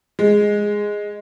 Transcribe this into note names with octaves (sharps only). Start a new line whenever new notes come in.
G#3